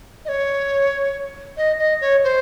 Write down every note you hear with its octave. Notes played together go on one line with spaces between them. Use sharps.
D#5
C#5
D#5
D#5
C#5
C5